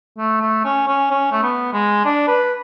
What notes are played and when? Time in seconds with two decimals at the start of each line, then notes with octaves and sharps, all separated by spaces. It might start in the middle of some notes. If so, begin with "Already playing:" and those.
0.18 A3
0.41 A3
0.64 C#4
0.88 C#4
1.11 C#4
1.32 A3
1.43 B3
1.73 G#3
2.05 D4
2.28 B4